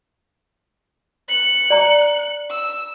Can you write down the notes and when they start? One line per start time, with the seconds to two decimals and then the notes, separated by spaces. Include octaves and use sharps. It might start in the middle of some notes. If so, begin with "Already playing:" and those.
1.29 F#6 C#7
1.70 D5 A#5
2.51 E6